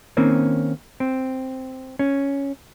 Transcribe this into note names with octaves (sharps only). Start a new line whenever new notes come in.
D#3 A#3 C4 C#4
C4
C#4